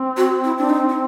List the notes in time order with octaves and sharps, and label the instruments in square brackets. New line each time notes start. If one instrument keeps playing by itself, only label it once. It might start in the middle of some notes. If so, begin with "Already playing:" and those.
Already playing: [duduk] C4
[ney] F#4
E4
D4
D#4
D#4